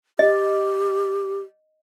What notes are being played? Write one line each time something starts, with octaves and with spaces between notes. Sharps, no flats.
G4 D#5